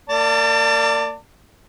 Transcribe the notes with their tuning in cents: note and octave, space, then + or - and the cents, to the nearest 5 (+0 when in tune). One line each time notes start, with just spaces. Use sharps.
A#3 -35 D5 +0 A5 +35